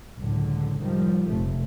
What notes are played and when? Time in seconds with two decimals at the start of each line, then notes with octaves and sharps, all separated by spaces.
0.18 C#2 F#2 A2 D3
0.80 D#3 F3 G3
1.27 F1 A3